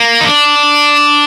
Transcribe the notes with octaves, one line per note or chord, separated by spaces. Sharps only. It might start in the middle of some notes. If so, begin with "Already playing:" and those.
Already playing: A#3
D#4
D4